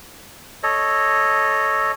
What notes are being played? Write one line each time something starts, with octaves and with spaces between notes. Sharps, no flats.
A4 C#5 D#5